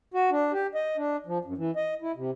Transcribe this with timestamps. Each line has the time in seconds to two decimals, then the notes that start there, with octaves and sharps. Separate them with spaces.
0.14 F#4
0.31 D4
0.52 G4
0.75 D#5
0.97 D4
1.26 F3
1.45 F#2
1.58 E3
1.76 D#5
2.02 E4
2.16 C3